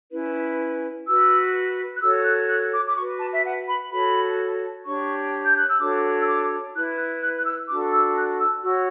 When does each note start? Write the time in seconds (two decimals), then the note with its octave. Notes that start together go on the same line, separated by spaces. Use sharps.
0.12 C#4 E4 B4
1.07 F#4 B4 E6
1.95 F#6
2.01 F#4 A4 C#5 E6
2.25 F#6
2.49 F#6
2.73 D6
2.87 D6
2.96 F#4 C#6
3.00 B4
3.20 A5
3.32 E5
3.44 F#5
3.67 B5
3.90 F#4 A4 C#5 B5
4.85 D4 G4 C#5 C#6
5.45 G6
5.56 F#6
5.68 E6
5.80 D4 F#4 A4 C#5 D6
6.19 E6
6.27 D6
6.74 E4 B4 F#6
6.98 F#6
7.22 F#6
7.39 F#6
7.45 E6
7.69 D4 F#4 A4 D6
7.93 E6
8.17 F#6
8.40 E6
8.64 F#4 C#5 E6